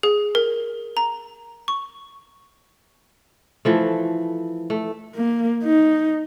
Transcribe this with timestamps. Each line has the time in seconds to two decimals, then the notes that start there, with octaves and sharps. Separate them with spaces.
0.03 G#4
0.35 A#4
0.97 A#5
1.68 C#6
3.65 E3 F3 A3
4.70 A3
5.15 A#3
5.63 D#4